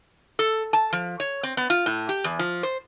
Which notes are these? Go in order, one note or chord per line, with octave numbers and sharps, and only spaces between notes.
A4
A5
F3
C#5
C4
B3
F4
A2
G4
E2
F3
C5